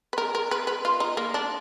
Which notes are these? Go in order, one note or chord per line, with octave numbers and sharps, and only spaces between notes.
B4
A#4
A#4
B4
B4
F4
D#4
A#3
D4